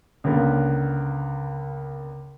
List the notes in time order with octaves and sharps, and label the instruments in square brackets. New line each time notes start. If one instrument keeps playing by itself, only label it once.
[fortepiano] C#2 D3 A#3 B3